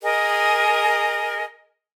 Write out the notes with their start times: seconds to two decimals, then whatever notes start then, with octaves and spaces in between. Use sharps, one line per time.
0.02 G#4 A#4 D#5